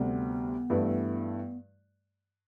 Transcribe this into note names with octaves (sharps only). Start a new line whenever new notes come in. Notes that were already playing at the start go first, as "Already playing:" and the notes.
Already playing: D2 C3 G3 B3
G2 E3 A3 E4 B4